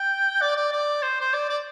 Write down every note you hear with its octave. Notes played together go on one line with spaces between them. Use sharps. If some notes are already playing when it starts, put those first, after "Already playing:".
Already playing: G5
D5
D5
D5
C5
C5
D5
D5